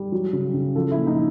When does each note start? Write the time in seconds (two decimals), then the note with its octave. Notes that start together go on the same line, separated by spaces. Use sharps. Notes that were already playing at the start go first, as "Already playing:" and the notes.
Already playing: G3
0.12 F#3
0.33 C#3
0.54 C#3
0.75 F3 A4
0.91 E4
0.97 A#2
1.07 D#4